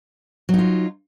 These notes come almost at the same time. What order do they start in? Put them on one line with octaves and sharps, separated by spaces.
F#3 D#4 F4